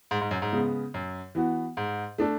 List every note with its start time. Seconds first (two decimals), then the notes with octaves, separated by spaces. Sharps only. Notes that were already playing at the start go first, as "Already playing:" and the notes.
0.11 G#2
0.21 G#2
0.31 F#2
0.42 G#2
0.53 C#3 G#3 B3
0.94 F#2
1.35 E3 B3 F#4
1.77 G#2
2.18 A3 D4 A4